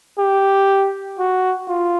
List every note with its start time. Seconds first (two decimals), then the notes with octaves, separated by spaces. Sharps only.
0.18 G4
1.19 F#4
1.69 F4